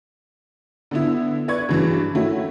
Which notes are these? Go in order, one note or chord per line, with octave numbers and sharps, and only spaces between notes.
D3 B3 E4
B4 D5 C#6 G#6
G2 C#3 E3 F#3
D#3 A3 C#4 E4 F#4